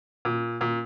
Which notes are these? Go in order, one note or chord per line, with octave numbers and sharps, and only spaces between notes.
A#2
A#2